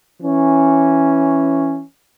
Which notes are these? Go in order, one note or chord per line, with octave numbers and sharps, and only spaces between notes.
E3 C#4